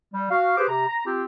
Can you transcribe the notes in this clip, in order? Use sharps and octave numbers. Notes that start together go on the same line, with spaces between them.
G3
F#4 F5
G4 G#4 B4 C5 D6
C3 G4 A#5
A#5
C4 F4 G4